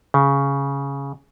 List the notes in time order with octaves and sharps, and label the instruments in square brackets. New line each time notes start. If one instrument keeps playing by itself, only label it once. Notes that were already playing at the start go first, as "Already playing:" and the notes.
[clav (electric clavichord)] C#3